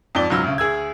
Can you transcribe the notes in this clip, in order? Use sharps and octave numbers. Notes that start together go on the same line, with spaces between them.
F2 G#2 D5 G7
C#2 G#2 F#3 E6 F6
D2 C#3
D2 G#4 E6 G#6